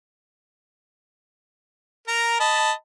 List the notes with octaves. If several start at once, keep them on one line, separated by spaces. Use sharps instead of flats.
A#4 A#5
D#5 A5 B5